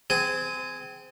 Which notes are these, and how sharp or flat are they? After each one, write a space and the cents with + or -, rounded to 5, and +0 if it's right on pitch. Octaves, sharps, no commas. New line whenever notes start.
C4 -30 G#4 +0